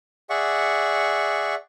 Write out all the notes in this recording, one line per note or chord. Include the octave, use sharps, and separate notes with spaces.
G#4 D5 E5 F#5 C#6